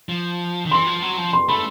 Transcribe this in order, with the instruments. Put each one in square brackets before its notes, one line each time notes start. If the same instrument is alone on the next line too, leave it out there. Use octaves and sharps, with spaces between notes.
[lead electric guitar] F3
D#3
[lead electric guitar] E3 [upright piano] C6
[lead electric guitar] F3
F#3
F3
[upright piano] C6
[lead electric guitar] A3 [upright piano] B5